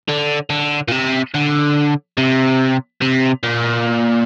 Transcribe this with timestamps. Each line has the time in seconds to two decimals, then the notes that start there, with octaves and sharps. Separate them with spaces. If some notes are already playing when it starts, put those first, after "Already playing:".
0.09 D3
0.50 D3
0.88 A#2
0.92 C3
1.35 D3
2.18 C3
3.02 C3
3.43 A#2